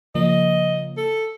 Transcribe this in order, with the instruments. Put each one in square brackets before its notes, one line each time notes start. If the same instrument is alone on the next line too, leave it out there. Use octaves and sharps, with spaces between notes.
[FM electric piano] C#3 F3 A#3 [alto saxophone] D#5
[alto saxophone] A4